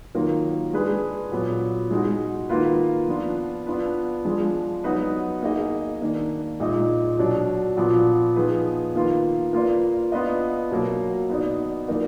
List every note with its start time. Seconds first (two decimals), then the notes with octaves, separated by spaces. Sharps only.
0.15 D#3 F#3 A#3 F4 A#4
0.73 G#3 D4 G#4 B4
1.32 A#2 F#3 B3
1.91 G#3 D#4 F#4
2.49 D#3 A#3 F4 B4
3.08 F3 B3 D4 F4
3.67 B3 D4 F4 B4
4.25 F3 G#3 D4
4.84 F#3 B3 D#4 F#4 B4
5.42 A#3 D#4 G#4 D#5
6.01 D#3 A#3 D4
6.60 A#2 G#3 D#4 G#4 D#5
7.19 B2 F#3 D4
7.77 A#2 F3 B3
8.36 F3 B3 D#4 G#4 B4
8.95 D#3 A#3 F4 B4
9.53 A#3 F4 B4 D5
10.12 B3 D4 F4 B4 D#5
10.71 B2 F#3 A#3
11.29 B3 D#4 F#4 D5
11.88 F3 A#3 D#4 A#4 D5